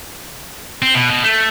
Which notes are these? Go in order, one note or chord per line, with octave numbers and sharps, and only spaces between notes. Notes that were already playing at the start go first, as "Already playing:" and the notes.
C4
B2
B2
A3